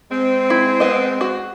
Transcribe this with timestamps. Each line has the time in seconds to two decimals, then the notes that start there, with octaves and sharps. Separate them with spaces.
0.11 G#3 C4
0.50 E4
0.80 B3 D#5
1.21 F#4